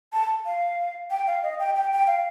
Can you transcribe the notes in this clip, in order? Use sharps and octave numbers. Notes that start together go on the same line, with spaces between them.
A5
F5
G5
F5
D#5
G5
G5
G5
F5